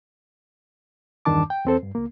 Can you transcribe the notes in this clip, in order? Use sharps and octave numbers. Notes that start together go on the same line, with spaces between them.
E2 G2 D#3 D4 A5 D6
G5
E2 C4 A4 C5
G2
C#2 A#3